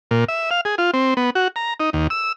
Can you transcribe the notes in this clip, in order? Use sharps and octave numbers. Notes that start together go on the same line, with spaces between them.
A#2
E5
F5
G#4
F4
C4
B3
F#4
A#5
D#4
D#2
E6